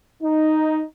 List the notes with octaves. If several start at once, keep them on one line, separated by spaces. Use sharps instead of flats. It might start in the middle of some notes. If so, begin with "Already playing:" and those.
D#4